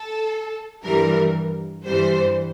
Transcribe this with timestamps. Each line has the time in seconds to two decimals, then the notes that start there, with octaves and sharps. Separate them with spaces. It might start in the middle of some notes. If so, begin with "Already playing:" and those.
Already playing: A4
0.84 G2 E3 G3 A#4
1.85 G2 E3 G3 C5